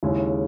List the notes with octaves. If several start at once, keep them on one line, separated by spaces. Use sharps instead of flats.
D#2 C#3 G#3 C#4 E4